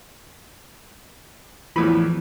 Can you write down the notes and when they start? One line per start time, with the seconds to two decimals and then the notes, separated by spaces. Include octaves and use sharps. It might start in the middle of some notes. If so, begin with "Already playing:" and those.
1.76 E2 A2 E3 F3 B5